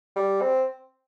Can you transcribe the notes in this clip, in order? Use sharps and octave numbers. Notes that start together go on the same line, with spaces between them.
G3
C4